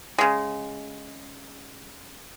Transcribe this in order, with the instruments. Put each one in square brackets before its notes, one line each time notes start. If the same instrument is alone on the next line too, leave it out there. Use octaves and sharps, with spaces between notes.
[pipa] C#3 G#3